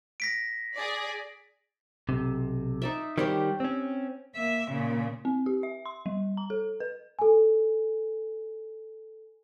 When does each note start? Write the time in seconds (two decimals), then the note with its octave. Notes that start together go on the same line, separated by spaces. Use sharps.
0.20 A#6 B6 D7
0.75 G#4 D5
2.09 B1 C3
2.82 D#4 D5 E5
3.18 D#3 G3 G4 C5 C#5
3.60 C4 C#4
4.35 A#3 E5
4.71 A#2 C#3
5.25 C4
5.46 G4
5.63 E5
5.86 C6
6.06 G3
6.37 A#5
6.50 A4
6.80 B4
7.19 A4 G#5